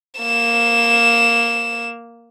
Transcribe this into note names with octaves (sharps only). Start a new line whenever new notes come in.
A#3 E7